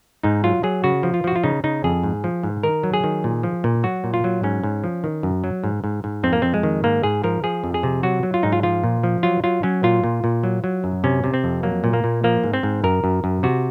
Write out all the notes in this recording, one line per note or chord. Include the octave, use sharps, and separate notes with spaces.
G#2 D#4
F#3 F4
F#3 G#4
C#3 F#4
F3
F4
F3 F#4
F4
C#3 D#4
C#3 D#4
F2 G#4
G#2
F3
G#2
D#3 A#4
F#3
G#4
D#3
A#2
F3
A#2
F#3 F#4
A#2
F4
F#3
G#2 C#4
G#2
F3
D#3
F#2
F#3
G#2
G#2
G#2
F2 C4
A#3
F2 C4
G#3
D#3
G#2 A#3
G#2 G#4
F3 A#4
F3 G#4
F2
G#4
C3
F#3 F#4
F#3
F4
G#2 D#4
F4
F3 F4
A#2
F3
F#3 F4
F#3 F4
F#3 C#4
A#2 F4
A#2
A#2
F#3
F#3
F#2
C3 C#4
C3
C4
F2
F#3 A#3
A#2
A#3
A#2
F3 A#3
G#2
C4
G#2
F#2 A#4
F#2
F#2
C3 F#4